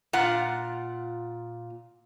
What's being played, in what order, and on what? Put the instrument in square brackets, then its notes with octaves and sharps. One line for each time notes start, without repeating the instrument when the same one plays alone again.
[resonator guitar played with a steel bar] A#2 F4 F#5